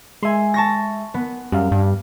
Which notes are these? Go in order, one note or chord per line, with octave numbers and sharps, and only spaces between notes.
G#3 E5 G#5 C6
A5 C#6 A#6
B3
F#2 G3 F5
G2